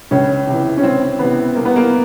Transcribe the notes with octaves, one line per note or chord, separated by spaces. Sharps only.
C#2 C#4
C3 E3
C#4
C#2 C4
C3 E3 B3
C2 A#3
B3
A#3